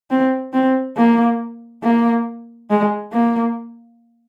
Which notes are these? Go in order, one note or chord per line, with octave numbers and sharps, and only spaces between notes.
C4
C4
A#3
A#3
G#3
A#3